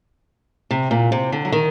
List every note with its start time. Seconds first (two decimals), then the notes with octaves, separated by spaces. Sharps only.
0.71 C3
0.91 A#2
1.12 C3
1.32 D3
1.45 F#3
1.52 D#3